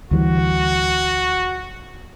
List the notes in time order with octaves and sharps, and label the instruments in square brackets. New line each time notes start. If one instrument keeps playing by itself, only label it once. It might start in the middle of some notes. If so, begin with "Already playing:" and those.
[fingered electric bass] D2 E3 G3 [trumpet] F#4